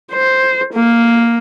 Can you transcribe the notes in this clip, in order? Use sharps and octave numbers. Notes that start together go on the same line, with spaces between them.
C5
A#3